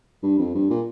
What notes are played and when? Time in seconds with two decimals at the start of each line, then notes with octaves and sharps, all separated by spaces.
0.23 G2
0.39 F2
0.55 G2
0.70 A#2